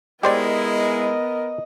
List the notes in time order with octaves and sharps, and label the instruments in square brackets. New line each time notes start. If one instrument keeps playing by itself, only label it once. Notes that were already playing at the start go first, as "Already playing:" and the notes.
[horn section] G#3 E4 [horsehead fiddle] B3 A#4 [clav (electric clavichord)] G4 C5 D5 [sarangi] D#5